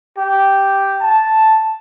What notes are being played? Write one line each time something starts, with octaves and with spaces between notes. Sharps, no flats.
G4
A5